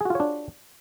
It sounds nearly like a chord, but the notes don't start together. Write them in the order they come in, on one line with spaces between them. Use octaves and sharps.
G#4 F#4 F4 C#5 D4